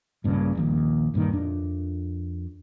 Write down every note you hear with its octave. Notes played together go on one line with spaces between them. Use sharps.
A#1 G2 A#2 C#3
D#1 A#1 D#2
D#1 G2 A#2 D#3
F2 D4